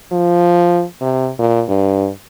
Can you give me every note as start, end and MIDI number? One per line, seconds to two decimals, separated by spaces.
0.12 0.84 53
1.01 1.30 48
1.39 1.63 46
1.68 2.08 43